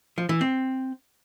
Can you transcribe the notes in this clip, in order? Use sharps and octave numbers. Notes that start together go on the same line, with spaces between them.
F3
E3
C4